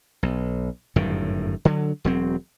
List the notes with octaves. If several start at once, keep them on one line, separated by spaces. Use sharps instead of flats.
B1
G1 F#2 A2 D#3
D3 F#3
E1 F#3 C4